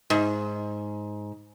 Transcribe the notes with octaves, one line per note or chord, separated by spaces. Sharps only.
G#2